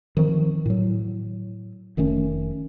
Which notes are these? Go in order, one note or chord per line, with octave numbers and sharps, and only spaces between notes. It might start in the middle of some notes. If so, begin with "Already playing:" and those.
D#3 F3 C4
A2 F#3
F1 D#3 A3 C#4